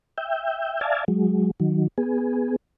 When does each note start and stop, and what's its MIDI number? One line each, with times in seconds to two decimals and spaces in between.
0.18 0.80 76
0.18 0.80 79
0.81 1.04 74
0.81 1.04 76
0.81 1.04 77
0.81 1.04 80
0.81 1.04 81
1.08 1.51 54
1.08 1.51 56
1.60 1.88 51
1.60 1.88 54
1.98 2.56 59
1.98 2.56 68